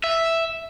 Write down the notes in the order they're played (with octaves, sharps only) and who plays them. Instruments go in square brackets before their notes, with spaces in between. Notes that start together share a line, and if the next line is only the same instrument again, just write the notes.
[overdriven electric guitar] E5